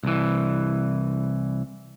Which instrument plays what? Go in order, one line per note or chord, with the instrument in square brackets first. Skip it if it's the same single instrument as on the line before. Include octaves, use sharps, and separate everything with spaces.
[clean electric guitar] C2 E3